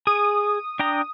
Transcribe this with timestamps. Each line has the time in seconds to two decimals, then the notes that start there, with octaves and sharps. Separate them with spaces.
0.07 G#4 D#6
0.79 D4 G5 A#5